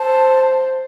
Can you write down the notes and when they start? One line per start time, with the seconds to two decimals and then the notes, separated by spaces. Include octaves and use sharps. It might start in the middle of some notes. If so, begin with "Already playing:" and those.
Already playing: C5 A5